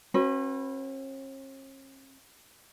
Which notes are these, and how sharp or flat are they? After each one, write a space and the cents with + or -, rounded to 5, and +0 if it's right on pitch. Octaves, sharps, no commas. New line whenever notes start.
C#4 -45 F#4 +0 B4 +0